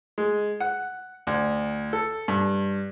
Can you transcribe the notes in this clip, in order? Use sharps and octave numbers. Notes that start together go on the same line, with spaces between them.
G#3
F#5
D2
A4
G2